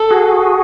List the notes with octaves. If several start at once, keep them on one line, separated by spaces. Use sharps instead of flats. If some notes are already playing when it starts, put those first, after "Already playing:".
Already playing: A4
F#4 G#4